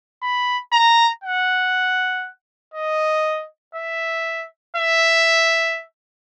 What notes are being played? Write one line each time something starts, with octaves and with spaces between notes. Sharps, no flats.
B5
A#5
F#5
D#5
E5
E5